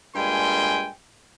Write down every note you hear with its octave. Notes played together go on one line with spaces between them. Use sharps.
G2 A#2 G#3 G5 G#5 C6